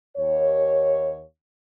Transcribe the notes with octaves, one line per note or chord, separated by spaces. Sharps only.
D#2 C#5